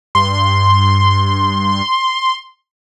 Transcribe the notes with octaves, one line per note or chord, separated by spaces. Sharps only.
G2 C6